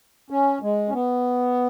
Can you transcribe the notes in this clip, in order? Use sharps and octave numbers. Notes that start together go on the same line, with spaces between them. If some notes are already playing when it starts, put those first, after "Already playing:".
C#4
G#3
C#4
B3